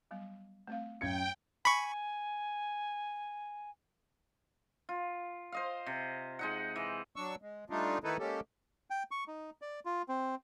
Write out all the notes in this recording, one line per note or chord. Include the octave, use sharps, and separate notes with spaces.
F#3 G3 B3
A3 C4 F5
F#2 F5 G5 G#6 C#7
G#5 B5 C#6
F4
C5 D#5 F5
C3
G#3 D#4 F#5
E3
F#3 D4 C#6 E6
G#3
G3 A3 D4 D#4 F4
D#3 A3 D#4 E4 A4 B4
G#3 A#3 C#4 G4 A4
G5
C#6
D#4
D5
F4
C4